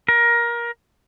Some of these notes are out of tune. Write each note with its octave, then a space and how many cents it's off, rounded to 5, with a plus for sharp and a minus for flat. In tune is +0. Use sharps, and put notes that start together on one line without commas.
A#4 +20